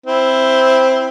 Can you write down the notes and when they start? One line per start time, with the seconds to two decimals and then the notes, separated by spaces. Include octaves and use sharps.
0.06 C4 E4